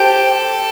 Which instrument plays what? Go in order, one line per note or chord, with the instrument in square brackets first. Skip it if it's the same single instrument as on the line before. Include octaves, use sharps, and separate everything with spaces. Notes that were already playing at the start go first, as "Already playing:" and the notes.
Already playing: [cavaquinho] G4 C5 G5 [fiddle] A4